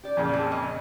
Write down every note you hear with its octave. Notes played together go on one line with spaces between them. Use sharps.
G4 D5
F2 A#2 C#3
C4 G#4 A4
C#5 D#5